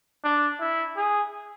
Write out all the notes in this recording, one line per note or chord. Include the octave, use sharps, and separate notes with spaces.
D4
E4
G#4